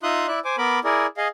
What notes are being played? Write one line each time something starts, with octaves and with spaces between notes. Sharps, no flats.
D#4 F4 E5 C6 D#6 F#6
E4 D5 E5 F#6
C5 G#5 D6
B3 A#4 B5 D6
E4 G#4 A#4 D5
G#4 D#5 F5